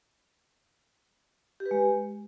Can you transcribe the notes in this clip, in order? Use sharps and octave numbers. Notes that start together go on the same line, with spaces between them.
G4
B4
G#3